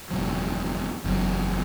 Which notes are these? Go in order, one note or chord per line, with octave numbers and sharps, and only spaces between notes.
F#1 E2 B2 F#3
F#1 E2 B2 F#3